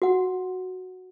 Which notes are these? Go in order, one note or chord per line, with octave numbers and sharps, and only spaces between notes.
F#4 F#5